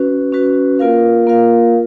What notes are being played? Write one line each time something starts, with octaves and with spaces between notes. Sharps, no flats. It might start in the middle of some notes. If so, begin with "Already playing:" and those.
Already playing: C#4 F#4 B4
C#4 F#4 B4
A#3 F4 A#4 F5
A#3 F4 A#4 F5